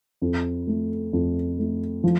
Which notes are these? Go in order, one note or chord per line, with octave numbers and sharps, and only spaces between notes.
F2
A3
F2
A3
F3